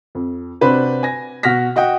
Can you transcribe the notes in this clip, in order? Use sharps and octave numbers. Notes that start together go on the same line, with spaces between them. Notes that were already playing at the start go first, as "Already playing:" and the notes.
F2
C3 D4 F#4 B4 C5
G#5 A#6
B2 F#4 F6 A#6 B6
F#4 D#5 F#5 G5